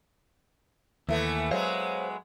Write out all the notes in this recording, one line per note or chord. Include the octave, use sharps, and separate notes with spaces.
D#2 E3 A3 B3
F#3 G#3 B3 C5 C#5 F5